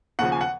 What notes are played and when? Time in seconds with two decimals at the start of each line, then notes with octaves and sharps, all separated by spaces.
0.19 D#2 C#3 F3 F#5
0.32 G#5
0.41 F#5